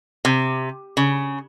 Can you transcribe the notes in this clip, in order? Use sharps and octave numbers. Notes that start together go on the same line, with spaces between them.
C3
C#3